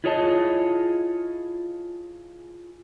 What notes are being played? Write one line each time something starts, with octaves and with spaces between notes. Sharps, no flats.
E4 F4 G#4 C#5 D#5 A5